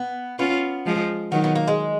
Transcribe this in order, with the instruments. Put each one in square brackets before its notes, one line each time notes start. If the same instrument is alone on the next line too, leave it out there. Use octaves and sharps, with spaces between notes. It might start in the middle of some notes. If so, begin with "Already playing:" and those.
Already playing: [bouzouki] B3
[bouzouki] B3 [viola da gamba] C#4 F4
[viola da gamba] F3 G#3
[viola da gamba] D#3 F#3 [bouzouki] B3
[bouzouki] B3
A#3
G#3